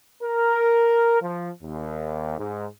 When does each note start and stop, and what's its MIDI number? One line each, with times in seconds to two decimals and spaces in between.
0.23 1.18 70
1.21 1.49 53
1.62 2.35 39
2.38 2.66 44